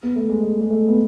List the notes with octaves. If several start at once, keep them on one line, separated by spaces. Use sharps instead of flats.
B3
A3
G#3
G#3
G#3
A3
B3